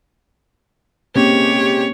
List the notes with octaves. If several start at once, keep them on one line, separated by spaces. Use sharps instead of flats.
C3 G#3 A#3 C4 C#4 G4 C#5